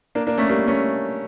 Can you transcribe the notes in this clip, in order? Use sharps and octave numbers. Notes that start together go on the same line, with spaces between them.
A#3 D4
A#3 D4
A3 C#4
G3 A#3
A3 C#4